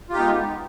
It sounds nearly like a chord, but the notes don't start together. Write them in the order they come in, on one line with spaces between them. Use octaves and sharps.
F4 G4 D#4 B3 G#3